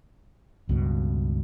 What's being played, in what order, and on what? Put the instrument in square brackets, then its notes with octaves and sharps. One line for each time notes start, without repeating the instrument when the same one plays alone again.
[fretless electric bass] C#2 G2 B2